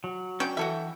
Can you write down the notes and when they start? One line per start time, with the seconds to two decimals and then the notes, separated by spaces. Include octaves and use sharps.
0.04 F#3
0.40 C#4 D4 G5
0.57 E3 F#4 A4 E5